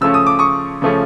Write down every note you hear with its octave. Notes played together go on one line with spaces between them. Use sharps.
C#3 F3 A3 C#4 E6
D#6
D6
C#6 D#6
C#3 F3 A3 C#4